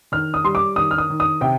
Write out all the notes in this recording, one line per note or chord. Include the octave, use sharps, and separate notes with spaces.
D#3 F6
D#6
G3 C6
D6
D#3 D#6
F6
D#6
D#3
D#6
C3 G5